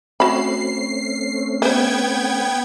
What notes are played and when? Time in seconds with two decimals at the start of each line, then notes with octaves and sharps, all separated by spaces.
0.20 A3 C4 C#4 F#4 B5 C7
1.62 B3 B4 C5 G5 G#6